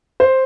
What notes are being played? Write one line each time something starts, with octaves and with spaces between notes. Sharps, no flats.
C5